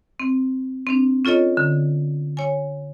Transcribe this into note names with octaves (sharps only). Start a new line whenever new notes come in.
C4
C4 D4
C#4 F4 A4 C#5 D#5
D3
C#5 G#5